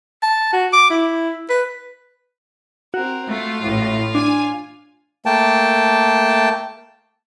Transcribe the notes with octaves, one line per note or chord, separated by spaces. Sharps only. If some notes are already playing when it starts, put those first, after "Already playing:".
A5
F#4
D6
E4
B4
C4 F#4 A#4
A3 F4
A1 A2
D4 G#5
A3 A#3 G5 A5